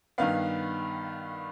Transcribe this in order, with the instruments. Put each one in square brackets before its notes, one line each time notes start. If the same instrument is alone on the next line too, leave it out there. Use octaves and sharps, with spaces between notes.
[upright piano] G2 D#3 B3 F5